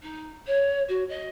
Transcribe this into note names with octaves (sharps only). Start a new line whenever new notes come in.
D#4
C#5
F#4
D#5